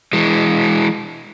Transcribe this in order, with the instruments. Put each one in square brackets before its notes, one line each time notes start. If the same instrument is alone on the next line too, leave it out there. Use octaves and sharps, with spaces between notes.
[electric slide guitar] E3 G#3